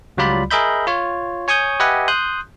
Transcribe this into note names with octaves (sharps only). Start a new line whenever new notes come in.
C#2 F#3 G3 F4 D5 B5
G#4 A#4 D#5 E5 B5 G6
F4 C#5
C#5 G#5 C#6 D#6 G6
G4 B4 D#5 E5 F#5 G#5
C6 D#6 F#6 G6